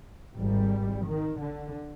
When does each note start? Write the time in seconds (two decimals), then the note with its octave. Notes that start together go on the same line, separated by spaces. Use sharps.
0.36 G#1 G#2 G3
1.07 D#3
1.42 D3